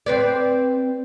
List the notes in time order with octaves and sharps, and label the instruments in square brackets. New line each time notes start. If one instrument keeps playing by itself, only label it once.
[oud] C4 B4 D5